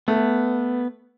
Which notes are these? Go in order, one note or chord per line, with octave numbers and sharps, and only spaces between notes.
A3 B3